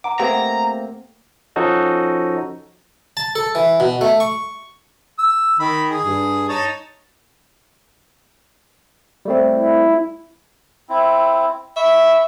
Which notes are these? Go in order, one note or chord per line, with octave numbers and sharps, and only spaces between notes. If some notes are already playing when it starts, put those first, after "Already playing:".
F#5 A#5 D6
A3 A#3 C4 G4 B4 F#5 A#5
F3 C#4 D#4 F#4 A4
A5
A4
E3
B2
A3
C#6
E6
D#3 B5
G#4
G2
D#4 C#5 A5
G3 A3 C4
E4
C4 E4
E5 B5 C#6